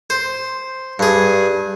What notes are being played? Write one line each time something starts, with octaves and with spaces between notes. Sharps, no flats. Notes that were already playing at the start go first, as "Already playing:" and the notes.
C5
G2 G#4